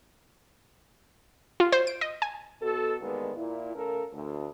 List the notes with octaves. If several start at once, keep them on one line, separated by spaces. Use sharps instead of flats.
F4
C5
D7
D#5
G#5
B2 F#4 A4
G2 D3 D#3 G#3 A#3 B3
A#2 E4
C#3 A3 A4 A#4
D2